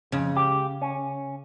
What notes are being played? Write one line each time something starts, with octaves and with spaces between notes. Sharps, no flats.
F2 C#3 C#4
C#2 G4
C#4